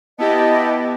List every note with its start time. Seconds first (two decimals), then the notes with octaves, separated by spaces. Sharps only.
0.18 B3 E4 G4 D#5 A5